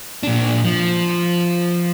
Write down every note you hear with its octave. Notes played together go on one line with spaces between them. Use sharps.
A#2 D4
F3